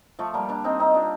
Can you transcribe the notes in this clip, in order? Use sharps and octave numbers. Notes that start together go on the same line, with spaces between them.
F3 A3
G3 A#3
A#3 D4
C4 D#4
C4 D#4
D4 F4